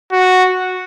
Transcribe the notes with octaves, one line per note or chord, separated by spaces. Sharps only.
F#4